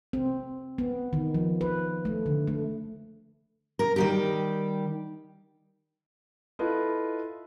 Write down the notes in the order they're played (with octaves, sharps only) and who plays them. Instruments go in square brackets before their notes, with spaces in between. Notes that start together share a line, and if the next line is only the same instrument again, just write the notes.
[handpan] C4
B3
D#3
F3
B4
A3
D3
A3
[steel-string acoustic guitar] A#4
D#3 G3 G4
[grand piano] E4 F4 A4 B4 D#5